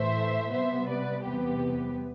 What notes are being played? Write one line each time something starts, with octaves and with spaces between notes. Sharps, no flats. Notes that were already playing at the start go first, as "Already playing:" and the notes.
Already playing: A2 E3 A3 C5 E5
C3 G3 B3 C5 E5
B4 D5
E2 C3 G3 B3 G4 B4